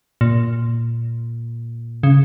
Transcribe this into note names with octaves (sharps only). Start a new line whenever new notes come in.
A#2
C#3